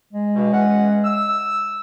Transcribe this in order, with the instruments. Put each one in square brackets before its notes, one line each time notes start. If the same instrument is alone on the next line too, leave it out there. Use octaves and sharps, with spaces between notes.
[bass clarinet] G#3
[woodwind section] G2 B2
E3 C#4 F#5
E6